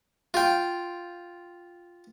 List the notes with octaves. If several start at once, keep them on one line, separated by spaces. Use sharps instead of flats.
F4 G5